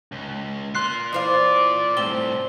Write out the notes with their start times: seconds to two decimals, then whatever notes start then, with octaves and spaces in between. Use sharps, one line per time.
0.12 C#2
0.75 F4 A#4 C6 F#6 C7
1.13 E3 C5 D5 F5
1.97 A2 G3 C4 G7